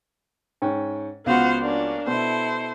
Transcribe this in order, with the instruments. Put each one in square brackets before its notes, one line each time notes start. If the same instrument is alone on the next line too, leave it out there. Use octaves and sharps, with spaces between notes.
[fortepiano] G#2 C#4 G5
[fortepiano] C#2 F4 F#4 [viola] B3 C5 [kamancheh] F5 F#5
[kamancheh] A#3 C#4 [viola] D4
[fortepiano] B2 [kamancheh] E4 A4 [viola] C5